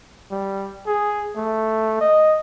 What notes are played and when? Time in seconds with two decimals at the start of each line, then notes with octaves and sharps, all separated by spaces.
0.31 G3
0.87 G#4
1.36 A3
2.01 D#5